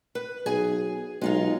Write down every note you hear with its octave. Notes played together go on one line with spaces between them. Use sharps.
B4
B1 G#4 G#5
B1 G#3 D#4 F4